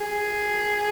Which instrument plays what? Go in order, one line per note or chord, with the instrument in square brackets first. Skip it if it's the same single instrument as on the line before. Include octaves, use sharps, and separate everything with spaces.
[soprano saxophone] G#4